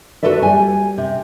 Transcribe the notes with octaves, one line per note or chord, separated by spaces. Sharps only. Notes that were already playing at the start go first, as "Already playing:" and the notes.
F#4 G4 A4 B4 D5 E5
G3 G#5
C3